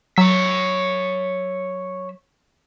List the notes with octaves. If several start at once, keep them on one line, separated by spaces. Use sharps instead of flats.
F#3 C#5 E5